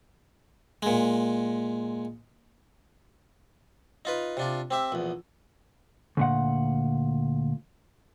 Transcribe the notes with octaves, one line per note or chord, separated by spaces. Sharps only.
A#2 G#3
D#4 F4 B4
C3 D4 F4
C4 G4 E5
A#1 E2
D2 A#2 F#5